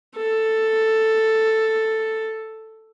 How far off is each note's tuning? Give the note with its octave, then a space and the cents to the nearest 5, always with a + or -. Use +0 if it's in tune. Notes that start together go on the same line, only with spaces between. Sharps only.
A4 +5